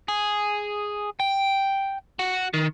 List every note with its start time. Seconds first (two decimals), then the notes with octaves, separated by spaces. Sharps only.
0.08 G#4
1.20 G5
2.19 F#4
2.54 D#3